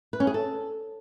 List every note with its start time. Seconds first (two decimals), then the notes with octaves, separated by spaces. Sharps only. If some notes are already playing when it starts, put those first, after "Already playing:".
0.13 B4
0.20 C#4
0.27 G#4
0.34 A4